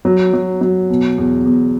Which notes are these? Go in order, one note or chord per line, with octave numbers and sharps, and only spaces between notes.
F#3
F#3
F#3
B2
E2
E2